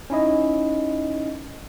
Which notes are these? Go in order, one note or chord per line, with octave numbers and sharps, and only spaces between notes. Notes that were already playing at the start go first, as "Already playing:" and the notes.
C#4 D#4 E4 D#5